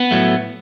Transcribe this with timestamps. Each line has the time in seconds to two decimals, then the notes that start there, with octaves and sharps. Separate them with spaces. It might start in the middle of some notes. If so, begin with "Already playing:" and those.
Already playing: B3
0.11 A2 F#3 A3